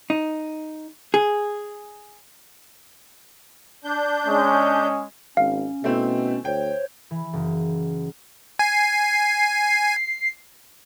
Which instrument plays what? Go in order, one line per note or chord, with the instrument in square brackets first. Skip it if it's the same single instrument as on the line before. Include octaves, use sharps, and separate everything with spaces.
[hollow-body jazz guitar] D#4
G#4
[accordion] D4 G6
[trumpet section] G#3 C#4
[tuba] G#1 [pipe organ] C#4 [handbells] F5
[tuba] B2 [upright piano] A3 C4 E4
[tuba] D2 [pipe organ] C5 C#5 [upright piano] G5
[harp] E3
F#1
[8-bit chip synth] G#5 [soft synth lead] C7